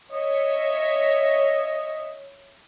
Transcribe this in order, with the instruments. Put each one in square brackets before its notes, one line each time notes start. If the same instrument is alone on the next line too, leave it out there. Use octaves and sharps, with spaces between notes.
[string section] C#5 E5 [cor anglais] D#5